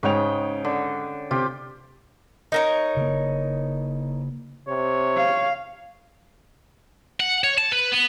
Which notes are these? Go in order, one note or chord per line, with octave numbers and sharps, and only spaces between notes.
G#2 C#3 C#5 G5 F7
D3
C3 F4 G4
D#4 A#4 C#5
C#3 A#3
C3 C#5
F5
F#5
C#5
A5
B4
B3